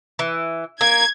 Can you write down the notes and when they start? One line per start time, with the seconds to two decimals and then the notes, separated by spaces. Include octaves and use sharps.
0.19 E3
0.81 A#3 G#6